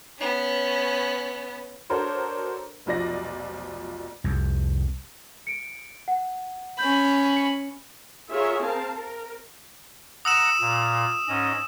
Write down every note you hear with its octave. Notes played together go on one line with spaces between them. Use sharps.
B3 C#4
D4 F#4 A4 A#4 C5 C#5
F1 B1 F3 D5 A#6
C2 F2
C#7 D7
F#5
C#4 B5 G6
C#7
F4 G#4 A#4 C#5 E5
C4 A#4 F5 A5
A#4
F#5 A#5 D#6 E6 E7
A#2
G#2 C#4 D#5